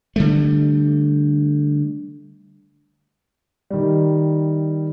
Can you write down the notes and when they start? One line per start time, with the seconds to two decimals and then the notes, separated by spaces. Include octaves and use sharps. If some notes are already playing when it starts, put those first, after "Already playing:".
0.16 D3 G3 A3
3.70 D#3 G3